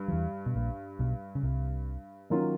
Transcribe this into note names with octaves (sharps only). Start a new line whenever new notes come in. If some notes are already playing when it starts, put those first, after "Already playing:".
Already playing: G2
F3
E2 E3
B2
A#1 A#2
B1 B2
C#3
C2 C3
D#3 F#3 A#3 C#4 F4